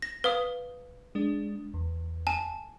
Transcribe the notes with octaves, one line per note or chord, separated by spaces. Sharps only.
A#6
B4 F5 D#6
G#3 D4
E2
G#5 A5